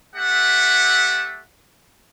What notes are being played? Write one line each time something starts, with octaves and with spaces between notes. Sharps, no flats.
A3 G4 E5 F#5